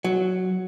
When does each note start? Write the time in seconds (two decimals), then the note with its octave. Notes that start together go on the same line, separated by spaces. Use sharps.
0.04 F#3